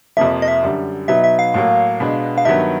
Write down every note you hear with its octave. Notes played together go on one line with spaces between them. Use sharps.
F2 C3 F3 A#3 E5
D#5
E5
F#2 D3 G3
B2 F#3 B3 D#4 E5
E5
F5
A2 F#3 A#3
B2 G#3 B3 D4
F5
G2 D#3 F#3 B3 E5